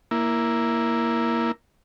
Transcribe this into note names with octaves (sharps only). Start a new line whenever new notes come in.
A#3 E4